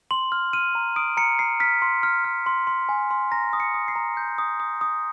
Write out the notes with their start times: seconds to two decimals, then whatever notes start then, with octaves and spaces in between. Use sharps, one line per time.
0.11 C6 F#7
0.32 F6
0.53 F6 D#7
0.75 A#5
0.96 D#6 D7
1.17 A#5 C#7
1.39 A#5 C7
1.60 F6 B6
1.82 C6
2.03 F6
2.24 F6
2.46 C6
2.67 C6
2.89 G#5
3.11 C6
3.32 A#5 A#6
3.53 D#6
3.60 C#7
3.74 D#6
3.88 C7
3.96 A#5
4.17 G6
4.38 D#6
4.60 D#6
4.81 D#6